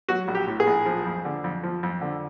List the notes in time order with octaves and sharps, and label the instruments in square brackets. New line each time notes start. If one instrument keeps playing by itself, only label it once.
[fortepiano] F#3 F#4
A#1
G4
A2
G#4
A#1
F3
F2
D3
F2
F3
F2
D3